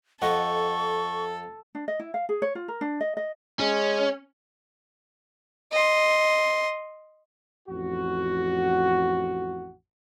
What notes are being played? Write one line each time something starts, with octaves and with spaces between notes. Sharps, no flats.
F2 A4 D#5 F#5 C#6
D4
D#5
E4
F5
G#4
C#5
F4
A#4
D4
D#5
D#5
G#3 C#4
D#5 C6
A1 F2 F#4